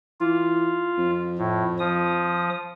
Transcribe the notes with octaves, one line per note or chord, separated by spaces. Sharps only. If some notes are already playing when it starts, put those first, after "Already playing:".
E3 F4
F2
A2
F3 D#6